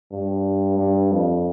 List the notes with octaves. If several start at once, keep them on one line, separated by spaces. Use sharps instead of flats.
G2
G2
F2